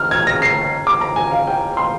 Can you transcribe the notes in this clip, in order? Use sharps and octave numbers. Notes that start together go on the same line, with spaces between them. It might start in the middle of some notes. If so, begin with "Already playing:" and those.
Already playing: F6
G#6
A#6
C7
D6
A#5
G#5
F5
G5
C6